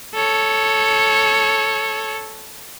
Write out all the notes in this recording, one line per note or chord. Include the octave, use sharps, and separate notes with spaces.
A4 C#5